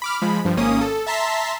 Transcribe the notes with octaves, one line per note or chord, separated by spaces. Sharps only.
B5 D6 F6
F3 G#3 B5
G2 F3
G#1 A#3 C#4 D#6
A4
E5 A5 A#5 C6 B6